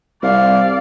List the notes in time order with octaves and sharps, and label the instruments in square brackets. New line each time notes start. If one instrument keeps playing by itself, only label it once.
[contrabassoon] C2 [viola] D5 F5